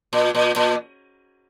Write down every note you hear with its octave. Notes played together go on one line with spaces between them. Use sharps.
A#2
A#2
A#2